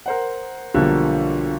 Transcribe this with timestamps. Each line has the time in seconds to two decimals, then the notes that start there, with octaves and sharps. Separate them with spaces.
0.06 A#4 C5 F#5
0.74 B1 D3 F3 G3 A#3